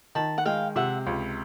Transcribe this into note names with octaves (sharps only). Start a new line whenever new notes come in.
D#3 A5 B5
F#5
G#3 F5 G5
C3 E5 F#5
C#2